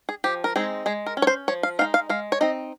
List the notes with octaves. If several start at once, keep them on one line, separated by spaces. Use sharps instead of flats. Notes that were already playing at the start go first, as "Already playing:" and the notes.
G#4
F3 G4
A#4
G#3 C4 D#4 G#4
G#3 G#4
A#4
C#4
C#5
C5
F3 C#5
F5
G#3 C4 D#4 F5
F5
G#3 F5
C#5
C4 D#4 D#5